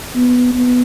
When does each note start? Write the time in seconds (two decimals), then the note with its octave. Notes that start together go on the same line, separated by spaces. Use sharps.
0.16 B3
0.54 B3